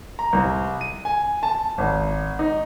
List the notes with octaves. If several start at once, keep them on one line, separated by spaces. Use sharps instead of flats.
A#5
C2
D#7
G#5
A5
G#1
D#4